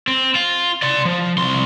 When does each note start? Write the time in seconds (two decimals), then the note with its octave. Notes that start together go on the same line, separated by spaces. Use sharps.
0.08 C4
0.35 F4
0.82 D5 C6
1.05 F3
1.38 C2 C6